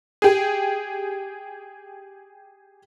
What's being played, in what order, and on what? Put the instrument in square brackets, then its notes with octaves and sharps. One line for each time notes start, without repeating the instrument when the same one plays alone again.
[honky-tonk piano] G4 G#4